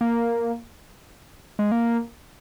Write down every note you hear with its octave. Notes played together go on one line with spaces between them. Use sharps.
A#3
G#3
A#3